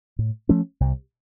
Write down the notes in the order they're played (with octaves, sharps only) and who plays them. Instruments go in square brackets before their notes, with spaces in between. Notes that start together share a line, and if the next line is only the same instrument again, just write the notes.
[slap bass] A2
F3 A3 C#4
C2